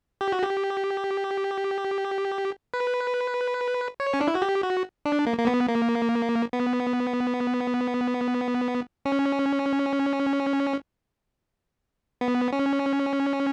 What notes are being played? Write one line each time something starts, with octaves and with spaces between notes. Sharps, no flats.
G4
F#4
G4
B4
C#5
C#4
D4
E4
F#4
G4
F#4
D4
A#3
A#3
B3
A#3
B3
C#4
B3
C#4